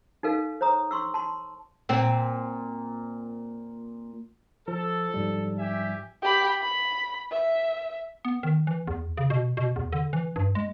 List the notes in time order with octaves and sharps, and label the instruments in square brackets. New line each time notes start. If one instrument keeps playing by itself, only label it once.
[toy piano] D#4 A4 A#4 F5
C5 C#5 A#5 D#6
C6 C#6 E6
A5 C6
[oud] A#2 C4
[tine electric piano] F3 [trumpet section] A4
[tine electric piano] G#2 F3 G3
[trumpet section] G4 E5 G#5
[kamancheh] G4 B5
B5
E5
[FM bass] B3
D#3
E3
E2
C#3
B2
B2
E2
D3
E3
G2
G#3